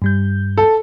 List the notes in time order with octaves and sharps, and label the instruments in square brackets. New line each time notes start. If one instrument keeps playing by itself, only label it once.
[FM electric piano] G2 G3 G6
[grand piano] A4